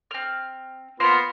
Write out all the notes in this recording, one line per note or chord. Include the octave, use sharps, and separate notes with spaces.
C4 F6
A#3 B3 F4 C5 F6